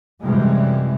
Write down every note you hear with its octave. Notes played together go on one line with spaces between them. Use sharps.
F#2 C3 E3 G3 G#3